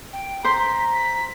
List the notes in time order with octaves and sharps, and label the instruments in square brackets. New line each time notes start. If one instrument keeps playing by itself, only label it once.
[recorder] G5
[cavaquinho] C5 C6 [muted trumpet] A#5 [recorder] B6
[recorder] B6